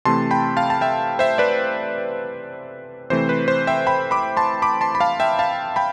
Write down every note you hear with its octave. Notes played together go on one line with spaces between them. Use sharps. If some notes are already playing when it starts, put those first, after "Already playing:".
C3 E3 A3 C4 A5 C6
G5 B5
F5 A5
A5
E5 G5
C5 E5
B4 D5
C3 E3 A3 C4 C5
B4
C5
E5 G5
G5 B5
B5 D6
A5 C6
B5 D6
A5 C6
B5
F5 A5
E5 G5
F5 A5
G5 B5